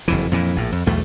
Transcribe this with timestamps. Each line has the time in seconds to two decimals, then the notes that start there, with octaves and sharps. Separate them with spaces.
0.08 F#1 F2 E3
0.32 F2 A#2 E3
0.56 A#1 A2
0.72 F2
0.86 B1 E2 A3